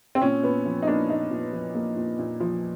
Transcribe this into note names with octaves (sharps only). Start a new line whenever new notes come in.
C4
A#2 C#4
A#2 B3
F3
D#4
A#3 D4
A#2 D#4
A#2
F3
A#3
A#2
A#2
F3